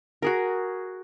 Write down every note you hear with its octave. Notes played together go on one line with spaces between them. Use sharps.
F#4 G#4 A#4